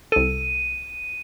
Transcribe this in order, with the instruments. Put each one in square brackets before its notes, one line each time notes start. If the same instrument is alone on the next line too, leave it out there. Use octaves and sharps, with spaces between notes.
[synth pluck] C2 A4 [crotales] D#7